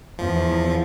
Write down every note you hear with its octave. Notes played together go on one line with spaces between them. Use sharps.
E2 F3